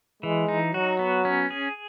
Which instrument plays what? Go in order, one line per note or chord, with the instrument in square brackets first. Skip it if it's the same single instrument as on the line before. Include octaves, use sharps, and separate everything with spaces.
[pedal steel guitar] E3 [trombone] G#3
[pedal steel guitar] D#4
[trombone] F#3 [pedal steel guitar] F#4
[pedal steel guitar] B3
C#4
G#4